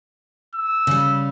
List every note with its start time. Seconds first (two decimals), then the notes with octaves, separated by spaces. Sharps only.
0.55 E6
0.87 C#3 G3